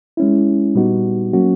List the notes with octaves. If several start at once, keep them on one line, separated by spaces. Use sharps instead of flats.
G#3 C#4 E4
A#2 G3 B3 D#4 F#4
F#3 A#3 C#4 F#4